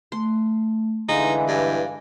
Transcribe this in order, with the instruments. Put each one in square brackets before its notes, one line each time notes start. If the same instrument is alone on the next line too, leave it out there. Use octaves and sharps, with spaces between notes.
[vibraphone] A3 [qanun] C6
[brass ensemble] D3 E3 [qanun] G#3 [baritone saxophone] D#4 [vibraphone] F5
[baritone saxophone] G2